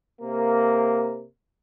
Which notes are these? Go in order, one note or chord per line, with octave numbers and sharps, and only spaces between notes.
C3 A#3